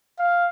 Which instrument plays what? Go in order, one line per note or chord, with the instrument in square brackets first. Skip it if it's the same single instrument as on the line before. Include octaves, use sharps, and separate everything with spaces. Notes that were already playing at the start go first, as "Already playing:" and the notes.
[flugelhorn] F5